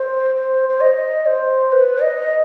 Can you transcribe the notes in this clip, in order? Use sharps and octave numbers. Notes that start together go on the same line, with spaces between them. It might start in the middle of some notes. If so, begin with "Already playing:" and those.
Already playing: C5
C5
C5
D#5
C5
B4
D#5